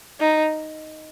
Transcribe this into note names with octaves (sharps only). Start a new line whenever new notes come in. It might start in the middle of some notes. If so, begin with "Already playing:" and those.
D#4